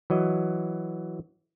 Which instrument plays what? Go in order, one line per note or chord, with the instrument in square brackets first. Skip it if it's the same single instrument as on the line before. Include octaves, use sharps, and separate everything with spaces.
[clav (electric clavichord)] E3 F#3 D#5